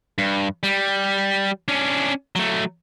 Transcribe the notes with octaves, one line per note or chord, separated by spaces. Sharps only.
G2
G3
C#4 D4
F#3 A3